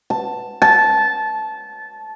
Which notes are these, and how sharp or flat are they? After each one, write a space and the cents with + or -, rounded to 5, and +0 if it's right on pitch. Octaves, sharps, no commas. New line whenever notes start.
A5 +5
A5 -20